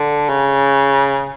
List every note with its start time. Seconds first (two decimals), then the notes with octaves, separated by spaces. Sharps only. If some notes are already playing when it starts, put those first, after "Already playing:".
Already playing: D3
0.29 C#3